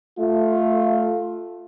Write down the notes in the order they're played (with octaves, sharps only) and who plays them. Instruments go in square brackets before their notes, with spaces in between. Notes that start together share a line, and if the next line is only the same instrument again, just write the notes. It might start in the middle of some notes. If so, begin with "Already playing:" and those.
[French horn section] A3 F4